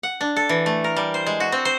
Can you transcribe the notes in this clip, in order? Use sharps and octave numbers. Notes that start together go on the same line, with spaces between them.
F#5
D4
A4
E3
A3
A#4
G3
C5
G#3
F#4
C4
C5